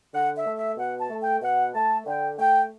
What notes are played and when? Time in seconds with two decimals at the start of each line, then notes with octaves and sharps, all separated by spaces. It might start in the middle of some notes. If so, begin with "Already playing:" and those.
0.13 D3 F#5
0.36 E5
0.46 A3
0.57 E5
0.77 B2 F#5
0.99 A5
1.10 A3
1.21 G5
1.42 B2 F#5
1.74 A3 A5
2.07 D3 G5
2.39 A3 G5